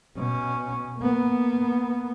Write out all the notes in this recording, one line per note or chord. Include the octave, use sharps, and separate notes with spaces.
B2 C#4
A#3 B3